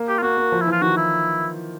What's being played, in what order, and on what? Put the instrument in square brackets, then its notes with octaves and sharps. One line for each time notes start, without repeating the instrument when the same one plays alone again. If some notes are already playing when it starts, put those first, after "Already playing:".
Already playing: [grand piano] A#3
[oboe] G4
F4
[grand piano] A#3 [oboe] F#4
[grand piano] A#3
F3
[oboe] E4
[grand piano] E3
[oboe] F4
[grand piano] D#3 [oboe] F#4
[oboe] E4